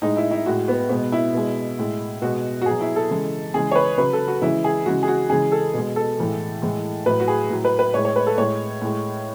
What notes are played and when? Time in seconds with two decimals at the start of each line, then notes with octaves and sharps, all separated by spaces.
0.02 A2 G#3 D#4
0.17 E4
0.31 E4
0.46 A2 G#3 F#4
0.68 B3
0.90 B2 G#3 B3
1.12 E4
1.34 B2 G#3
1.79 A2 G#3
2.22 B2 G#3 F#4
2.62 F#4
2.66 B2 F#3 G#4
2.81 E4
2.96 A4
3.10 C#3 E3 G#3
3.54 C#3 E3 G#3 G#4
3.71 C#5
3.75 B4
3.98 C#3 F#3 B4
4.13 A4
4.28 F#4
4.42 C#3 E3 G#3 E4
4.64 G#4
4.86 C#3 E3 G#3 F#4
5.03 G#4
5.08 F#4
5.30 C#3 E3 G#3 G#4
5.52 A4
5.73 B2 G#3
5.96 A4
6.18 A2 E3 G#3
6.62 A2 E3 G#3
7.06 A2 F#3 B4
7.20 F#4
7.28 G#4
7.50 A2 F#3
7.65 B4
7.79 B4
7.94 A2 G#3 C#5
8.05 C#5
8.16 B4
8.27 A4
8.38 A2 G#3 C#5
8.82 A2 G#3